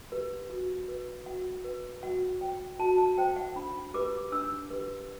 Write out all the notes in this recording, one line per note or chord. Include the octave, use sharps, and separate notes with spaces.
G4 B4
F#4
B4
F#4 F#5
B4
F#4 F#5
C5 G5
F#4 A5
A5
C5 G5
F#5
D4 B5
G4 B4 D6
D4 E6
G4 B4